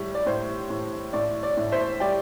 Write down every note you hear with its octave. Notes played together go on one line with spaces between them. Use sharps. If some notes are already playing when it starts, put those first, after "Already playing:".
Already playing: A2 G3
D5
A2 C5
A2
A2 D5
D5
A2
C5 E5
G3 D5 G5